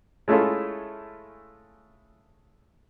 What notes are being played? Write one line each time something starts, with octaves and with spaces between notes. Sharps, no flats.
G#3 A3 C#4 E4 F4 A4